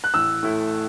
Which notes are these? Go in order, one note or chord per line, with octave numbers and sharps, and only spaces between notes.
F#6
A1 E6
A2 A3 E4